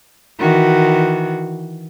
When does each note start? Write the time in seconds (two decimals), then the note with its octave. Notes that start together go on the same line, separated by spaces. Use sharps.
0.39 D#3 E3 F#4